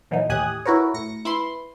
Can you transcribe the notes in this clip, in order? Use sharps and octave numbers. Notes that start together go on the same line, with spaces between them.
A#2 E3 F#3 D#4
D#2 A2 G4 G#5 D#6 F#6
E4 F#4 A#4 B4 C#5
A2 A#6 C#7
E4 B4 C6